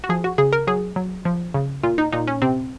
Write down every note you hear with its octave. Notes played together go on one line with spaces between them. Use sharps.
F#4
F3 G#4
F#4
C#3 G#4
A#4
F#3 G#4
F#3
F3
C#3
A#2 F4
D#4
A#2 D#4
C#4
C3 C4